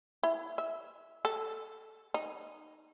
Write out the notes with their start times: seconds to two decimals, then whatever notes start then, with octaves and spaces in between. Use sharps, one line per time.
0.23 E4
0.58 E5
1.25 A4
2.14 D#4